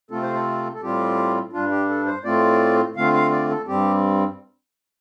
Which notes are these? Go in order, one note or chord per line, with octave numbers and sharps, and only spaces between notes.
C3 A3 C4 F4 A4
C5
A4
A4
A2 G3 C4 F4 G4
G2 G3 D4 F4
G4
A4
C5
A2 A3 C4 F4 D5
D3 A3 C4 F4 F5
F5
D5
A4
G2 G3 C4 G4